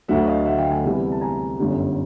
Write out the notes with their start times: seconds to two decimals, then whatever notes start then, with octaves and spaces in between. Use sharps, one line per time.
0.08 D2 D3 F#3 E5 F#5
0.27 D#5 F5
0.45 E5 F#5
0.58 F5 G5
0.71 F#5 G#5
0.83 E2 C3 E3 G3
1.12 A5
1.21 G#5 A#5
1.59 G1 F#2 D3 G3